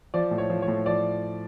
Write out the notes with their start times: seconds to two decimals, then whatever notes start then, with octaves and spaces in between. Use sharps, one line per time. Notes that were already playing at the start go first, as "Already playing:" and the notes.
0.14 F3 D5
0.31 A2
0.38 C#5
0.50 F3
0.62 C#5
0.68 A2
0.86 F3 D5